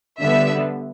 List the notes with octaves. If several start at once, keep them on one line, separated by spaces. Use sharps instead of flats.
D3 G3 B3 E5